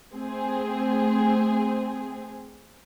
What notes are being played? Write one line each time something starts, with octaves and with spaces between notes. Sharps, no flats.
A3 C4 G#4